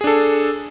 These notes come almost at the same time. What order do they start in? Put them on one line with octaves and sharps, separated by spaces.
G#4 D4 A4